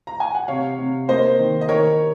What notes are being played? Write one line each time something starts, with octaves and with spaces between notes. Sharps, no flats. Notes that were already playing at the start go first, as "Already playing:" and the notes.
A#5
G#5
F#5
C3 C#5 F5
C3
A#3 C5 D#5
D#3
D#5
D#3 A#4 C#5